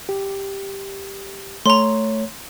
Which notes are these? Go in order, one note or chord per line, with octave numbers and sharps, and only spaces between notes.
G4
A3 C#5 A#5 C6